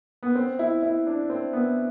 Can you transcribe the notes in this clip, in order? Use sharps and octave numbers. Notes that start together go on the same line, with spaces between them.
B3
C4
E4
E4
D4
C4
B3